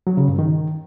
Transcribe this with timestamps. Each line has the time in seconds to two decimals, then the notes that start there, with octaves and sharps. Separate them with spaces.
0.07 F#3
0.17 C#3
0.28 G2
0.39 D#3